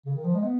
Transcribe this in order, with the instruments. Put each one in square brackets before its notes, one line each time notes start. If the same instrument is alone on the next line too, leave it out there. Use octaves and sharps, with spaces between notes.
[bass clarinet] C#3
D#3
F3
G#3
B3